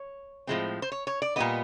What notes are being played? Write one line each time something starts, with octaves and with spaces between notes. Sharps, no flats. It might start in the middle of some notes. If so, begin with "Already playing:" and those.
Already playing: C#5
A2 F3 G#3 C4
C5
C#5
C#5
D5
A#2 G3 B3 D#5